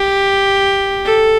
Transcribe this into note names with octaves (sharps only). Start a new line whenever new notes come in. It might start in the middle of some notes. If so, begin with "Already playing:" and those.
Already playing: G4
A4